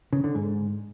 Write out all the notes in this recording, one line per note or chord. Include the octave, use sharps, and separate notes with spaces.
C#3
D3
G#2